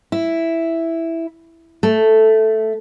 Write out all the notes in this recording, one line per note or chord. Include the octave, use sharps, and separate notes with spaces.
E4
A3